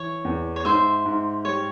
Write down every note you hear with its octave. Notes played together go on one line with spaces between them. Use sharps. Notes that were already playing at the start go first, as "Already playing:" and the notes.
Already playing: E3 C#5
E2
C#5
G#2 C5 E5
G#2
G3 C#5